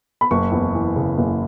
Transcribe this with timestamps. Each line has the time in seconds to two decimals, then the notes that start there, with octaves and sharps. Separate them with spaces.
0.21 B5
0.31 F#1 C#6
0.52 E2
0.74 E3
0.96 C#3
1.18 F#1